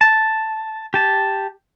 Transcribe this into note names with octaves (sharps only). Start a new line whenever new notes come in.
A5
G4 A5